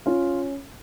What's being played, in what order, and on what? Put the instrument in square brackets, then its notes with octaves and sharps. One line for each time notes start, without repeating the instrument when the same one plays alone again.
[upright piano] C#4 F4